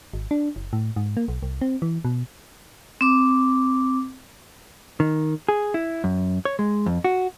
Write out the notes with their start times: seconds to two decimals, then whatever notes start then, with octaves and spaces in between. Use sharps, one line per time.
0.14 G#1
0.31 D4
0.56 F#1
0.73 A2
0.96 G#2
1.17 A#3
1.28 B1
1.43 C2
1.61 C4
1.82 E3
2.05 B2
3.01 C4 D6
5.00 D#3
5.49 G#4
5.74 E4
6.04 F#2
6.45 C#5
6.59 G#3
6.86 F2
7.04 F#4